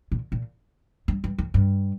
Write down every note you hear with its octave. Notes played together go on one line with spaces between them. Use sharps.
A#2
A#2
G2
G2
F2
G2